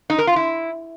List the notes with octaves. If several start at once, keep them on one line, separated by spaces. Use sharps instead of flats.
D#4
A#4
F4
E4